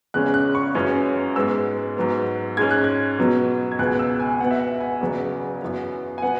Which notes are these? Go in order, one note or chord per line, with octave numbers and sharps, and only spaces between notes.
E2 C#3 G#3 C#4 F#6
F#6
C#6
F#2 E3 G#3 C#4
G#2 G#3 B3 E6
G#2 F#3 B3
G#2 G#3 C#4 G#6
F#6
G#6
B2 F#3 B3
G#6
C#2 B2 B3 F#6
E6
G#5
B2 B3 F#5
E5
F#5
G#5
E2 C#3 F#3 B3
F#2 E3 B3
G#5
B2 B3 F#5